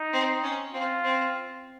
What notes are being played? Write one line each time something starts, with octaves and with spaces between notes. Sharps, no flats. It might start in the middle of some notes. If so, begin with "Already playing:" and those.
Already playing: D#4
C4
C#4
C4 F4
C4